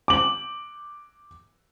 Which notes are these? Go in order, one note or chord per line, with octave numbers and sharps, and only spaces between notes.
D6 F#7